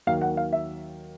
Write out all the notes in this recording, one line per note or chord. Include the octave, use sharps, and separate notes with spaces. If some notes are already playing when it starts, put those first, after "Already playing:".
D#2 D#3 F#3 A#3 F5
F#5
F5
E5